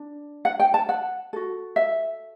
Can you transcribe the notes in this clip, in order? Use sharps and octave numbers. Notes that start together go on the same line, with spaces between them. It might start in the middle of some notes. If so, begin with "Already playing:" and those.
Already playing: D4
F#5
G5
A5
F#5
F#4 A4
E5